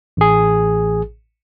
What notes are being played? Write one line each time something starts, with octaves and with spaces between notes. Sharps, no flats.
A1 G#4